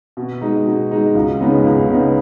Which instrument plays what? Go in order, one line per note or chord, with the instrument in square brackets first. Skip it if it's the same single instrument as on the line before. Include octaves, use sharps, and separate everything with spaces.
[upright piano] B2
G#3 D#4
B2
G#3 D#4
C#2
C#3 G#3 B3 D#4
C#2
C#3 G#3 B3 D#4